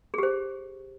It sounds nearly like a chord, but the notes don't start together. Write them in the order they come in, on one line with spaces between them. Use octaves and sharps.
G#4 G4 C5